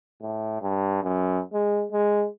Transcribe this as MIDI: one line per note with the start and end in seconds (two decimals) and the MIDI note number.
0.22 0.60 45
0.62 1.00 43
1.03 1.41 42
1.53 1.85 56
1.91 2.27 56